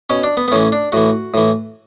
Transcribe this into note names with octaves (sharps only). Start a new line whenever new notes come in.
B2 C#4
D4
B3
B3
A2 E3 C#4
D4
A2 E3 F#4
A2 E3